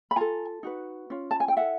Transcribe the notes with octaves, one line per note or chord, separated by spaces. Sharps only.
B5
F4 A4 G#5 A#5
D#4 F#4 B4
C#4 F4
A5
G#5
G5
E4 A4 E5 F#5